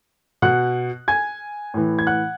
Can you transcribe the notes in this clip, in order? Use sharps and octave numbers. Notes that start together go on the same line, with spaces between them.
B2 F#5 F#6
G#5 G#6
A2 E3
G#6
F#5 F#6